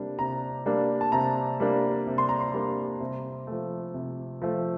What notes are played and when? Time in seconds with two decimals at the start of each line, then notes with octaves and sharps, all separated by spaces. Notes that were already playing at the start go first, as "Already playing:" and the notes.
Already playing: C3 G3 A#3 D4
0.19 C3 A#5
0.66 G3 A#3 D4
1.01 A5
1.12 C3 A#5
1.60 G3 A#3 D4
2.07 C3
2.18 C6
2.29 A#5
2.40 C6
2.54 G3 A#3 D4
3.01 C3
3.47 F3 A3
3.94 C3
4.42 F3 A3